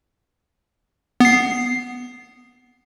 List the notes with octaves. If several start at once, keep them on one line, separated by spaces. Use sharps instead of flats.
B3 C7